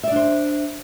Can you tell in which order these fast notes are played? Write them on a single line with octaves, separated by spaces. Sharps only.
E5 D5 D4 C5